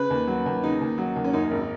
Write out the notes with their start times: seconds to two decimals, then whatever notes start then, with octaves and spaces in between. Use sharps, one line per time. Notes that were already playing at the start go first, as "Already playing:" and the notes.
Already playing: C#3 B4
0.10 D#2
0.27 F#3
0.46 D#2
0.63 C#3 D#4
0.81 D#2
0.98 F#3
1.16 D#2
1.24 C#4
1.33 F#2 D#4
1.51 G#1